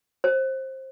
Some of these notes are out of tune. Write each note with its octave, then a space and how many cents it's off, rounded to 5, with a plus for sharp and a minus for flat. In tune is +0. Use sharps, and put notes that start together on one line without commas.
C5 +20